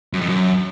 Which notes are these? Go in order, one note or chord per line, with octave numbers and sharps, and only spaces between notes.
F#2
F2
F#2